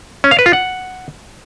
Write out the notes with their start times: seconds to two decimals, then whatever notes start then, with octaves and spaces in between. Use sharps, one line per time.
0.24 C#4
0.31 F5
0.39 B4
0.46 F4
0.53 F#5